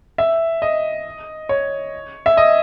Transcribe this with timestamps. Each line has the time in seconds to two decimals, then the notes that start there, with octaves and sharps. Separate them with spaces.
0.18 E5
0.62 D#5
1.49 C#5
2.26 E5
2.37 D#5